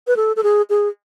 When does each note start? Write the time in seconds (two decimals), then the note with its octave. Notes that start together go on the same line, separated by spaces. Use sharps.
0.07 B4
0.16 A4
0.36 A4
0.43 G#4
0.70 G#4